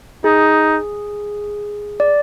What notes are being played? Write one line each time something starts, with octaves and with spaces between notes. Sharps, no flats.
D#4 G#4
D5